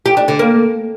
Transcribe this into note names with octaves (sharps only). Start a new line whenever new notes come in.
G4
D4
D3
A#3